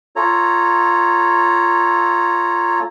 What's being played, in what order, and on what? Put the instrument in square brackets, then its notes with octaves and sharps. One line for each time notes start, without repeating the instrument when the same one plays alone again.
[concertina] F4 A4 C#5 A#5